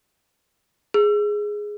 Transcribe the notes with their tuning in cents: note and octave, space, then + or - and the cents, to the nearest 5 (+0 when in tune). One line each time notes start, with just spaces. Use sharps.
G#4 +0 E6 +35